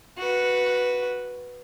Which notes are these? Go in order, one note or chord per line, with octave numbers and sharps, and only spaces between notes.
F#4 B4